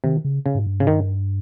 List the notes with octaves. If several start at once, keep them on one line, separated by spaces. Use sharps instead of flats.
C3 D#3
C#3
C#3
G#2
G2
G#2 C#3
G2 D#3